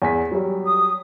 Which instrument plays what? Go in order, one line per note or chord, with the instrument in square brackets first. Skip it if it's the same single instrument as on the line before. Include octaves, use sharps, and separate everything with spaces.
[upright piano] E2 G#5 B6
F#3 G3
[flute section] D#6